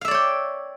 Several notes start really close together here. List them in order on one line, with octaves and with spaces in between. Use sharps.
F5 E5 D5 C#5 G5